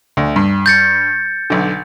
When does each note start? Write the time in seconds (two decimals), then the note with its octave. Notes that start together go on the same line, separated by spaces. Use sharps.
0.17 D2
0.36 G2
0.66 G6 A6 C#7
1.50 B1 D3